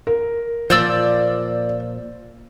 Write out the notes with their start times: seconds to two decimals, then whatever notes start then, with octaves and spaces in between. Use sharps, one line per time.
0.07 A#4
0.70 A#2 F3 C5 D5 E6